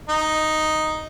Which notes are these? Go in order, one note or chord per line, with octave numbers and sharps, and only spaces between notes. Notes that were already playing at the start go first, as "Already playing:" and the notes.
D#4